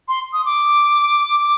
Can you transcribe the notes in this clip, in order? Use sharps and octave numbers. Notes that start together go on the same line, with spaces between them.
C6
D#6
D6